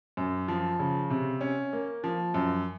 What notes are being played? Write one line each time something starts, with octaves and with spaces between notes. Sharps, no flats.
F#2
F3
C#3
C3
C#4
A#3
F3
F#2